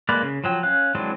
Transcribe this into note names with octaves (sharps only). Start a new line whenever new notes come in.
G#3 A#3 B4 D5
C#3
F3 F#3 G5
C#4 F5 F#6
E3 F#3 G#3 C4 D4